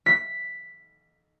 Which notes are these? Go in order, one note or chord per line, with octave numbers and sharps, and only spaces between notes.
B6